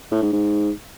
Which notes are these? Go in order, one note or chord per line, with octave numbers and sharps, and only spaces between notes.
A2
G#2
G#2